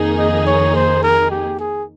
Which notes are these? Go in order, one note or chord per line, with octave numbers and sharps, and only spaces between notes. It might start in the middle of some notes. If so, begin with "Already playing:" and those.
Already playing: F2 D#3 A#3 D#4 G#4
D#5
C#5
C5
A#4
G4
G#4